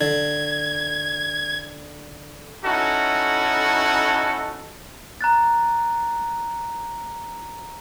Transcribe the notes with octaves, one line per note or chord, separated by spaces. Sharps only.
D3 G#6
C#4 D#4 E4 F#4 A4
A#5 F#6 A6